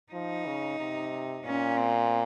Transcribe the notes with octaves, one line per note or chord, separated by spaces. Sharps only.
F3 D#4
C#3
C3
A#2 C#4
C4